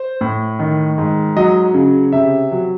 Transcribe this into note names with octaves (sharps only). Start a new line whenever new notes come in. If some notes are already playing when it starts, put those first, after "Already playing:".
Already playing: C5
A2
D#3
G#2
F#3 D#5
C#3
C3 E5
F#3